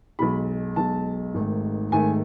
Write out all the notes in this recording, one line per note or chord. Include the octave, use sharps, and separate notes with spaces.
B1 B2 G#3 B5
B1 B2 G#3 A5
G#1 G#2 D#3 A3
G#1 G#2 D#3 A3 G#5